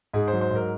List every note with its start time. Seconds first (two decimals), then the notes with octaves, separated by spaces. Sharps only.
0.13 G#2 G#4
0.28 C5
0.33 F#3
0.41 C5
0.51 G#2
0.56 A#4